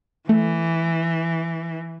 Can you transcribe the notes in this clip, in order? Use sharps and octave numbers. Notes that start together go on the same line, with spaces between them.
E3 A3